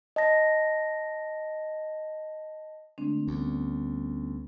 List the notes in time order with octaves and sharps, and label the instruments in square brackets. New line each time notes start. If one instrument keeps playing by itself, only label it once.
[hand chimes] D#5 A5 A#6
[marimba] D3 C4 D4 [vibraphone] G#3 A3
[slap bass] D2 [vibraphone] G3 B3 C#4